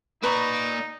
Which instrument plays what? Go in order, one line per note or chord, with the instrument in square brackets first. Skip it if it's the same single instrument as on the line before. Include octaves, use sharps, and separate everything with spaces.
[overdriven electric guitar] A#3 D5 [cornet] D#4 [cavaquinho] B4 A#5 C#6